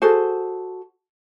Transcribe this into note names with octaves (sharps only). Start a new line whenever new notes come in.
F#4 G#4 A4 C5